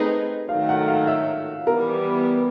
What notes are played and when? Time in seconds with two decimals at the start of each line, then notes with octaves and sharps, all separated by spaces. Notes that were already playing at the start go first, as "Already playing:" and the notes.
Already playing: A3 C4 D#4 G#4 B4
0.49 D#3 F#3 A3 F5
0.69 F#5
0.88 F5
1.07 E5
1.66 E3 G3 B3 A#4